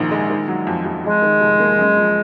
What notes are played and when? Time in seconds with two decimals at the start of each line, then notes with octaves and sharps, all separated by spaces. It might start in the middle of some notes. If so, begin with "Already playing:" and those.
Already playing: A#1 G#2 D#3
0.11 G#3
0.29 D#3
0.48 F#3
0.67 F2
0.85 F2
1.04 F2 G#3
1.22 D#3
1.41 F1
1.60 A#3
1.78 F#2
1.97 F3